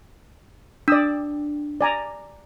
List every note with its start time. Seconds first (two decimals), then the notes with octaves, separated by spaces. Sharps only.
0.88 D4 D5 D#6 E6
1.81 D5 G#5 A#5